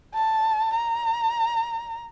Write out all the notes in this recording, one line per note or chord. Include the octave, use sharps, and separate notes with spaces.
A5
A#5